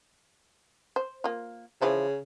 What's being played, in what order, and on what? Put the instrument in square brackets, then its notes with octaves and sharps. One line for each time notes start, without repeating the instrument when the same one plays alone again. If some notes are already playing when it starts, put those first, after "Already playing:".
[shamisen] C5
A#3 F4
[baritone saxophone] C#3 [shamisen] E3 F3 E4